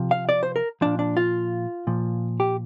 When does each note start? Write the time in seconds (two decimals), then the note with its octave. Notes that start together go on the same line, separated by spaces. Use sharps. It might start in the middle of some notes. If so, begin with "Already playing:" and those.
Already playing: C3 F3
0.11 F5
0.29 D5
0.43 C5
0.56 A#4
0.81 A#2 F3 D4
0.99 D4
1.17 F4
1.87 A#2 F3
2.40 G4